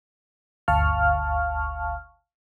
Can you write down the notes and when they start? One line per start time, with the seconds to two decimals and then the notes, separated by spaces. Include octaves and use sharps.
0.68 G1 D2 F5 A5 C#6 F6